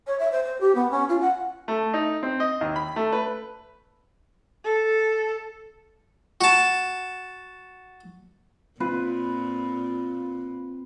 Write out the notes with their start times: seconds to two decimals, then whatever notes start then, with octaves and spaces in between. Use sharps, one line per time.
0.07 C#5
0.19 E5
0.32 C5
0.44 C5
0.61 G4
0.75 B3
0.91 C#4
1.09 F4
1.21 F#5
1.68 A3
1.94 D#4
2.23 C4
2.40 D#5
2.61 D#2
2.76 B5
2.96 A3
3.12 B4
4.64 A4
6.41 F#4 A5
8.80 A#2 C4 F4 B4